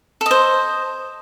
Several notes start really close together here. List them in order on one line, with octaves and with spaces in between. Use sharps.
A4 D#5 C5